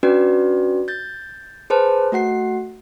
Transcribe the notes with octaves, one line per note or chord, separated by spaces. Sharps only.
C#4 D4 F#4 B4 D5
G6 A6
G#4 B4 C5 A5
A3 F#4 F#5 C7